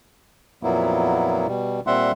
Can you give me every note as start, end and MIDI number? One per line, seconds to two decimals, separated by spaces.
0.63 1.47 41
0.63 1.47 46
0.63 1.47 54
0.63 1.47 58
0.63 1.47 59
0.63 1.47 64
1.47 1.80 47
1.47 1.80 55
1.87 2.12 46
1.87 2.12 55
1.87 2.12 60
1.87 2.12 76
1.87 2.12 78
1.87 2.12 84